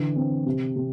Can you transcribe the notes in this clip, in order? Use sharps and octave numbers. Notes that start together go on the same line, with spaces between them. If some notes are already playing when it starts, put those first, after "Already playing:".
Already playing: D3 E3
C4
C3
C3